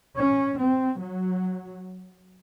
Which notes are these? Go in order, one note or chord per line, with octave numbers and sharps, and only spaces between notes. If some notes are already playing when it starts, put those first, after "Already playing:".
C#4
C4
F#3